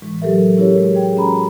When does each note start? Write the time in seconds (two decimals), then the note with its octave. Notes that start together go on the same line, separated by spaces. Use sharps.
0.02 A2 E3 G#3
0.22 F#3 G4 A4 A#4 E5
0.57 C#4 E4 F#4 G4 A#4 C#5
0.74 G#3 G#4
0.95 G#4 G5
1.17 C#4 F#4 A#5 B5